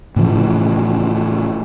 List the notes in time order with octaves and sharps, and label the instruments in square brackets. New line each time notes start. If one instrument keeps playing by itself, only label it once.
[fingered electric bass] A2 C#3 E3 F3